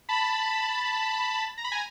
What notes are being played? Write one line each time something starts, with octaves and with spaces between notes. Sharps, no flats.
A5 B5
A#5
B5
G#5 A#5